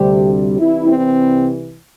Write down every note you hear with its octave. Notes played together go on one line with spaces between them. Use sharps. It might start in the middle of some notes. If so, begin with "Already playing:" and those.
Already playing: D2 C3 G3 G4
C2 C3 E3 G3 E4
C4